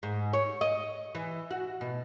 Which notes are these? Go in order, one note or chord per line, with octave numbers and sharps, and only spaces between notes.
G#2
C#5
D#5
E3
F#4
B2